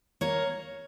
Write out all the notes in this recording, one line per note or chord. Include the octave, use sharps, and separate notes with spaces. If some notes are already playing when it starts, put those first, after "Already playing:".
A#3 A#4 C#5